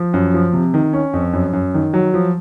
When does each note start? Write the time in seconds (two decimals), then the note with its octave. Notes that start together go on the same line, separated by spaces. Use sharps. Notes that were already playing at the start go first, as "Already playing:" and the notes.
Already playing: F3
0.14 F#2
0.34 F3
0.53 C3
0.74 D#3
0.93 C#4
1.13 F2
1.33 F#2
1.53 F#2
1.74 D#3
1.94 F#3
2.14 F3